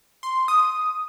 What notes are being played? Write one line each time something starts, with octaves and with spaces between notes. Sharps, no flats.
C6
D#6